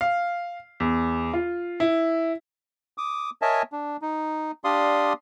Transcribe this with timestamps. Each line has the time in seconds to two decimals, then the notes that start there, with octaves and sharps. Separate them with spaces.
0.01 F5
0.80 E2
1.33 F4
1.80 E4
2.98 D6 D#6
3.42 A#4 C#5 D#5 E5 G#5 A5
3.72 D4
4.02 D#4
4.64 D4 G4 D5 F5 C6 D#6